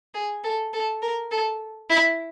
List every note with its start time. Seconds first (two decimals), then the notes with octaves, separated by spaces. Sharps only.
0.14 G#4
0.44 A4
0.73 A4
1.02 A#4
1.31 A4
1.90 E4